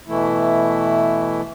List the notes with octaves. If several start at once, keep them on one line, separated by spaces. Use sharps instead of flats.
B2 E3 A3 E4